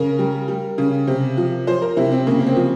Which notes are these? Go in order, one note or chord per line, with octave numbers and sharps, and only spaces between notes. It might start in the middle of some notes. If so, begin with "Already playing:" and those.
Already playing: C#3 A#4
G3
G3
C#3
C3
F3
F3 C5
A#4
C3 E4
C4
C#3 A#3
A#3
C4
F3